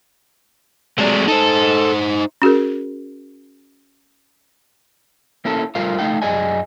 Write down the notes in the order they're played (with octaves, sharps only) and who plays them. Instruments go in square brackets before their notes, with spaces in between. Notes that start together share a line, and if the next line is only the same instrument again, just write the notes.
[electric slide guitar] F#3 G#3 A3 [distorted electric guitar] C4 D5
[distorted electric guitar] D#4 C5 [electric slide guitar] A4
[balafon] C#4 F#4 G#4 A#4
[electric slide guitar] A#3 C#4 E4 A4
G3 A3 F4 A#4 C5 F5
A3 D#4 F5 G5
F#2 G#4 D5 D#5 G#5